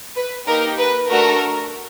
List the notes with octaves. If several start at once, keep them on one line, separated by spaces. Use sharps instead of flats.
B4
A#3 D#4 G4 A#4
B4
A3 D4 F#4 A4 A#4